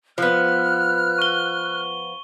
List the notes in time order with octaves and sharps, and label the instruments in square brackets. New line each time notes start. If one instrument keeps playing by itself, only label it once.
[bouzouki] F3 B3 [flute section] F6 F#6
[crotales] C#6 G7